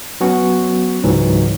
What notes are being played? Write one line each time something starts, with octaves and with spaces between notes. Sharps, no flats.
F#3 B3 C#4 F#4
C#2 G#2 E3 F#3